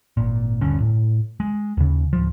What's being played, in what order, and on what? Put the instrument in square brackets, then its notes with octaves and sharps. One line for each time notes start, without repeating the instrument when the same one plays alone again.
[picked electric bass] G#1 A#2
D#1 G2 D3 C#4
A2
G#3
D#2 C#3
D1 F3